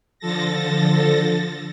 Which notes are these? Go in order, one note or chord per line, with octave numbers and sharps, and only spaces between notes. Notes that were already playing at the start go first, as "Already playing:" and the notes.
D3 F3 A4 A6 A#6